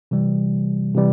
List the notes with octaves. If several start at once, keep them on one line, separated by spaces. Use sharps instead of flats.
C3 E3 G3
C3 E3 G3